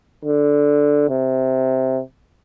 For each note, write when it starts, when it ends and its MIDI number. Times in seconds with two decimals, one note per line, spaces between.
0.25 1.06 50
1.09 2.00 48